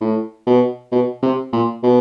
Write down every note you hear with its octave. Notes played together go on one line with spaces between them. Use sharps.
A2
B2
B2
C3
A#2
B2